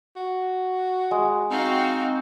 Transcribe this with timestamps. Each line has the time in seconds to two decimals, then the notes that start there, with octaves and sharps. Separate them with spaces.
0.16 F#4
1.11 G#3
1.51 C4 D#4 F#4 F5 G5